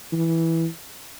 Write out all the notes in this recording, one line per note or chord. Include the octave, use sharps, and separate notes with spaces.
E3